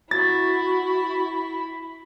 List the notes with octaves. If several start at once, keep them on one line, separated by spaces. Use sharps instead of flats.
E4 F#4 B5 A6